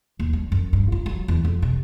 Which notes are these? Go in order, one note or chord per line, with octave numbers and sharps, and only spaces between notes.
D#2
G3
F#2
G2
F4
F#3
E2
F2
C3